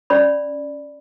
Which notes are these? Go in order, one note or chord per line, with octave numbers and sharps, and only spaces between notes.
C#4 D5 B5